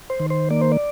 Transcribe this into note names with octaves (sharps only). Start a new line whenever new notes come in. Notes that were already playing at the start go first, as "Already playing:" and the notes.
C5
D#3
C5
A#3 D5
C5
D5